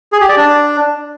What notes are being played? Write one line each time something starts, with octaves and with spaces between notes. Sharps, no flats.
G#4
G4
D5
D4